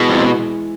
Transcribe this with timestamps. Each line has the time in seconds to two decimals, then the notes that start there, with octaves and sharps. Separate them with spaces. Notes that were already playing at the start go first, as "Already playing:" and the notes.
Already playing: B2 E3 G#3
0.10 F2